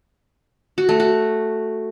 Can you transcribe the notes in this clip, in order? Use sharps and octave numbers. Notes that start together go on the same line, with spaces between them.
F#4
A3
F#4